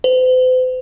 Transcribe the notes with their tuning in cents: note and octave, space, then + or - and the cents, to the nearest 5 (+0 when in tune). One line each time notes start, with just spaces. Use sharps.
C5 -45